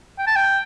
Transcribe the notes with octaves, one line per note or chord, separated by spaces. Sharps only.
G5
A5
G5